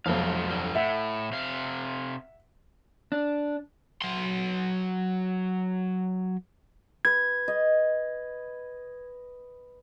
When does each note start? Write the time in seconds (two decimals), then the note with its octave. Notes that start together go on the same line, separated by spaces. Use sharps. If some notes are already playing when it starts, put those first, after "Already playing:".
0.06 F1 B1 F3 G#3 F5
0.51 G2 D3 G3
0.75 A2 E5 F#5
1.32 C3 F5
3.12 D4
4.02 F#3 C6
7.05 B4 G#6
7.48 D#5